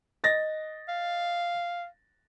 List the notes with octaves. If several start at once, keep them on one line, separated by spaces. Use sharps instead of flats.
D#5 A6 A#6
F5